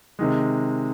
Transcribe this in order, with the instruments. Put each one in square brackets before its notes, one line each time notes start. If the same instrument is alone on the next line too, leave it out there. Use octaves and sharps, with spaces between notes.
[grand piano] C3 D#3 G#3